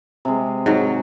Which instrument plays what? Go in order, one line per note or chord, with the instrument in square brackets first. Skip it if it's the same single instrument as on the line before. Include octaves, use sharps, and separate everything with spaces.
[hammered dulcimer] C3 G#3
[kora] G#2 F#3